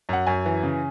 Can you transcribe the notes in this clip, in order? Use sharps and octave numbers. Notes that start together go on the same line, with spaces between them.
F#2 F#5
F#2 G#5
E3
C#3